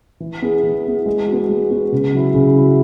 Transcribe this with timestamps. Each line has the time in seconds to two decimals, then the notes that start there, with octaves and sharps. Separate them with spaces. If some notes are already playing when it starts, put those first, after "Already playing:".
0.20 E3
0.42 B3 E4 G#4
0.63 E3
0.84 B3 E4 G#4
1.06 G#3
1.27 F#4
1.32 B3
1.49 G#3
1.71 B3 F#4
1.92 C#3
2.14 F#3 E4
2.34 C#3
2.56 F#3 E4